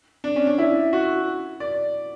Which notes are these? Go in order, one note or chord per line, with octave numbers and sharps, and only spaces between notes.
D4
C#4
D4
E4
F#4
D5